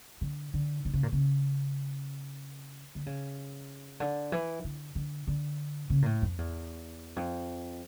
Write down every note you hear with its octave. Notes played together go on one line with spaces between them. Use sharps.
D3
D3
D3
C#3
A#2
C#3
D3
C#3
D3
E3
D3
D3
D3
C#3
A#2
A2
F2
E2
F2